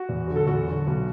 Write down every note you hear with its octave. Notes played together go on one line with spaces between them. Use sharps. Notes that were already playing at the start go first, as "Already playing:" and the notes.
Already playing: F#4
E2
D3 F#3
A4
E2 F#4
D3 F#3
B1